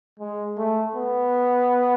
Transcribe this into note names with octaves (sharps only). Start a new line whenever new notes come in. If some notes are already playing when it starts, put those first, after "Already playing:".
G#3
A3
B3